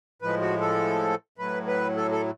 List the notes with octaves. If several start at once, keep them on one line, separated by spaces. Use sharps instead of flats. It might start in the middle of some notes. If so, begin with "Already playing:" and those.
A2 F3 G#3 B4
F#4
A4
A2 F#3 B4
B4
A4
A4